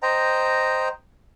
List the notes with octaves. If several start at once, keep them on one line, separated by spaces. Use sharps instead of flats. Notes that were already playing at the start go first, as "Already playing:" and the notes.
C5 D#5 G5 A#5